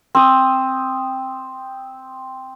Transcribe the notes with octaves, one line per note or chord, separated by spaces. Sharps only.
C4 D#6